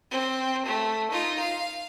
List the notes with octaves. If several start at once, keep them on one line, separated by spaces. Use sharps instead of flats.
C4
A3
D#4 F4
F5